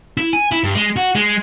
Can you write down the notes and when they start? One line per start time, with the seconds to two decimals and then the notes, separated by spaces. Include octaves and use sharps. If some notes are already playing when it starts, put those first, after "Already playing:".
0.17 E4
0.33 G#5
0.52 E4
0.64 G2
0.75 G#3
0.96 F#4
1.15 G#3